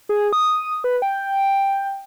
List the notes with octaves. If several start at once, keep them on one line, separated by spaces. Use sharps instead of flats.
G#4
D#6
B4
G5